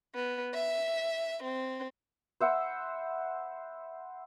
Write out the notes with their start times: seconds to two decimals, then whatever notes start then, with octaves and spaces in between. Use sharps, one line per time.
0.15 B3
0.54 E5
1.44 C4
2.41 C5 E5 F#5 B5